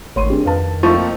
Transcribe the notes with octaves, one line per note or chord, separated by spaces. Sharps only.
G#1 D#3 A3 C#5 B5 C6 D#7
C4 D4 G4 G#4
F2 B4 F5 A5
F3 A3 A#3 C4 D#4 C#6 A6 D#7